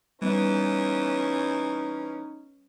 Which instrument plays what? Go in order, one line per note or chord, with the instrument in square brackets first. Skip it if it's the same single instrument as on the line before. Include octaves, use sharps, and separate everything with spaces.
[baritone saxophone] E3 [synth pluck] G3 B3 [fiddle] C#4 [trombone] D#4